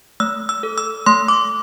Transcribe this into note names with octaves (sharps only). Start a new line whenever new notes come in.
A3 E6
E6
A4
E6
A3 C6
D6